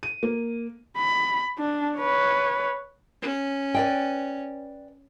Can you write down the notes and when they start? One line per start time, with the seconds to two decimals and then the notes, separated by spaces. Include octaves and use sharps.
0.03 D#7
0.23 A#3
0.97 B5
1.58 D4
1.98 B4 C#5
3.22 C#4
3.74 B4 D5 G5